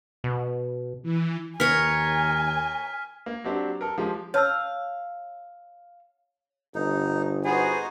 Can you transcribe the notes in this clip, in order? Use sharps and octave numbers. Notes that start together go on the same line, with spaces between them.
B2
E3
D#2 A#4 C#5 G#5 F6 B6
A#3
F#3 C4 D4 G4
A4 A#4
F3 G#3 G4
C#5 F5 A5 E6
G1 D#4
B3 D#4 F#4 G#4 C5